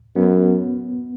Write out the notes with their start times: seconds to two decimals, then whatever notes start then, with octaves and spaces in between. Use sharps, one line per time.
0.16 F#2 B3